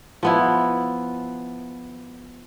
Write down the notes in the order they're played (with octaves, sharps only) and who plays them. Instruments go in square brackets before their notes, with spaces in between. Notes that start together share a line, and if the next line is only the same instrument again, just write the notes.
[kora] F3 B3 E4